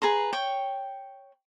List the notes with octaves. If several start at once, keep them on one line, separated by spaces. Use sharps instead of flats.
G#4 B4 A#5 C6
C#5 G5